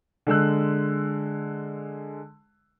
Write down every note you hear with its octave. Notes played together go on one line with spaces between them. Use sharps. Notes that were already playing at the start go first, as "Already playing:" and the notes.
D3 G#3 E6 F#6